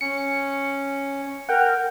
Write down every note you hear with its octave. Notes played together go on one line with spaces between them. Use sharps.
C#4 C#7
A#4 F#5 G5